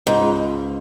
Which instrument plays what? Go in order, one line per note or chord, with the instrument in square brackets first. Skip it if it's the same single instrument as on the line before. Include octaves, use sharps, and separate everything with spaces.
[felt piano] C#2 [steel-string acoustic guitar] G#2
[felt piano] C#2